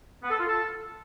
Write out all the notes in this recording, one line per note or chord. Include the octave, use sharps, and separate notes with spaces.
B3
A4
F4
A4